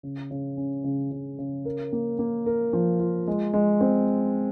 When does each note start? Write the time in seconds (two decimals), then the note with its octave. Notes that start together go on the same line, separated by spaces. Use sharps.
0.03 C#3
0.31 C#3
0.57 C#4
0.84 C#3
1.11 C#3
1.38 C#3
1.65 A#4
1.92 A#3
2.19 A#3
2.46 A#4
2.73 F3
3.00 F4
3.27 G#3
3.54 G#3
3.81 C4